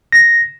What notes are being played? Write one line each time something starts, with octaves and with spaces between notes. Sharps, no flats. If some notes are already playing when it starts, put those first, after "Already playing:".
A#6